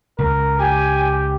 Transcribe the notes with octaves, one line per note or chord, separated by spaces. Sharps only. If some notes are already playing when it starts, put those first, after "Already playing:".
C#2 A#4
G4 G#5